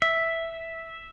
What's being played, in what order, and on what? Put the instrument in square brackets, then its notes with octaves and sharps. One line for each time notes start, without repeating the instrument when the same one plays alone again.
[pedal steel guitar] E5